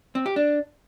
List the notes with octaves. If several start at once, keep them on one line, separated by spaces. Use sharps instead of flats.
C4
G4
D4